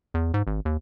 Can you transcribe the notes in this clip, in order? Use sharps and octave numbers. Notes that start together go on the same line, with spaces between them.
E2
G#2
G#1
D#2